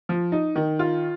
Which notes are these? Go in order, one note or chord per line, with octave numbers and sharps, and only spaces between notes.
F3
D#4
D#3
F4